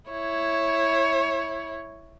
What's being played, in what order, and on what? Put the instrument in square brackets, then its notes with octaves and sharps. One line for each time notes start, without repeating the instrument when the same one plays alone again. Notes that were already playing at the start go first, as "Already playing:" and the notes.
[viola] E4 C#5